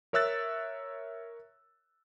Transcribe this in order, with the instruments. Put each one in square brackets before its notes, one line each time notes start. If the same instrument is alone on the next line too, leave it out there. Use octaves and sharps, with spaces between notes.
[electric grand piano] A#4 C#5 E5 E6 F#6 A6